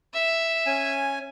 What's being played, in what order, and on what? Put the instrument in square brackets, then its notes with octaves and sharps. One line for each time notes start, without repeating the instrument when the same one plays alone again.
[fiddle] E5
[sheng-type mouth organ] C#4 G#5